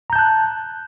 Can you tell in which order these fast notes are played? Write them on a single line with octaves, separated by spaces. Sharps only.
A#5 G6 A5 F#6